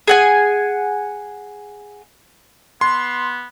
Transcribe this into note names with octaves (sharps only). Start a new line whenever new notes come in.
G#4 F#5 G#5
B3 C6